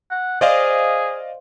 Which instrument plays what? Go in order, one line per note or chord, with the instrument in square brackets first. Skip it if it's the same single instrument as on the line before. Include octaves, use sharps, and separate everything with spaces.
[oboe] F#5
[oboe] G#4 [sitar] C5 [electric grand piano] D5 D#5 F5